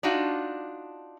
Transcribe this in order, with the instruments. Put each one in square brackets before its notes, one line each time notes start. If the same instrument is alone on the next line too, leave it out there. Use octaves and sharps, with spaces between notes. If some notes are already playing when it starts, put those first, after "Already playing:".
[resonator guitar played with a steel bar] D4 D#4 F4 F#4